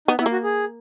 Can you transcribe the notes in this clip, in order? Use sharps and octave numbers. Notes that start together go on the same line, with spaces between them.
B3 D#4
B3 E4
A#3
F#4
G#4